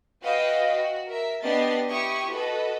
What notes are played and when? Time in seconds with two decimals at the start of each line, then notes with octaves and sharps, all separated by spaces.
0.22 F#4 B4 D#5 F5 G5
0.73 F#4
1.06 A#4 E5
1.43 B3 D4 G4 D#5 A6 C7
1.89 E4 G4 C#6 D#6
2.31 F#4 A4 B4 D#5